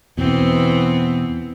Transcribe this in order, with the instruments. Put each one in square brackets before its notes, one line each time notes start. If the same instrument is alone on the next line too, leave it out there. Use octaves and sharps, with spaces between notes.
[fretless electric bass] E2 B2 [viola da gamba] E3 B3 C4